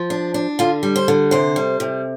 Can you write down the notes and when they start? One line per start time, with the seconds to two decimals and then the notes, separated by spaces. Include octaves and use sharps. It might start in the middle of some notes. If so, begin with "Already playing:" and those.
Already playing: F3
0.10 D4
0.34 D4
0.59 D3 F4
0.83 G3
0.96 C5
1.08 D3
1.31 C3 C5
1.56 G3
1.80 C3